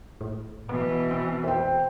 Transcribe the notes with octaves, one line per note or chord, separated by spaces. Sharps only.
A2
B2 E3 B3
C4
C5 G5